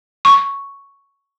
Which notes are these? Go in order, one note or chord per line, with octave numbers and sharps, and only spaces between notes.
C#6